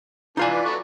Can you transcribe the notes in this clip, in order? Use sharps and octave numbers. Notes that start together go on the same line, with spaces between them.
E3 D4 D#4 F4 G#5 A5
B4 D5
F#3 A4 C#6